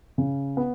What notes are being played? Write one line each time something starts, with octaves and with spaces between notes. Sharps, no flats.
C#3
B3